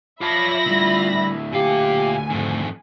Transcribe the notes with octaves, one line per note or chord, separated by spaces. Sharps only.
F4 C#5 D5 E5 A5 B5 A#6
D2 G3 E4
A#2 G4 F5 G#5
F2 G#2 D#3